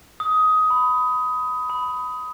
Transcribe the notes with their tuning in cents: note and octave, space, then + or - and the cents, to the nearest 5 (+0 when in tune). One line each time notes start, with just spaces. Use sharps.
D#6 +15
B5 +15
B5 +15